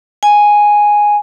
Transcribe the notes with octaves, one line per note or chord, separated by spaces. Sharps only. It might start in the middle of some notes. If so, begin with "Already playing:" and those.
G#5